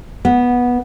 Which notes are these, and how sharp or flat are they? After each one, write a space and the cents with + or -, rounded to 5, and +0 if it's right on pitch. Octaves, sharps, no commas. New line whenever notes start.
B3 -10